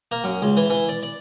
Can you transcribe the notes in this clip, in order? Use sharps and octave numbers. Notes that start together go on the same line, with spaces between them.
A#3
F#2
C#2
E3
E3
D5
D5